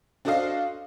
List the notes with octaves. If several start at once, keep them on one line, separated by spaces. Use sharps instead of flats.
D4 F#4 A4 C5 D#5 F5